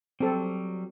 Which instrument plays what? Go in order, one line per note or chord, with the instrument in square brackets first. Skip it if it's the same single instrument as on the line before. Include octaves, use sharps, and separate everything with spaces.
[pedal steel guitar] F#3 G3 [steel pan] C4 A4